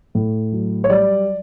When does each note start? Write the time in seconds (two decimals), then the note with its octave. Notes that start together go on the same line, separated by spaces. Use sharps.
0.15 A2
0.52 F#3
0.84 C#5
0.90 G3 D5